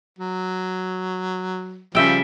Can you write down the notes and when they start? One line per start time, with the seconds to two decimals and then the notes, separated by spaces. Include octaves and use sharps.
0.19 F#3
1.95 C#3 F3 G3 E5 G5